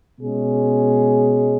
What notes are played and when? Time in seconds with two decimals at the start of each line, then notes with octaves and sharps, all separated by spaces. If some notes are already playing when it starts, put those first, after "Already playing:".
0.18 B2 G#3 C#4 G#4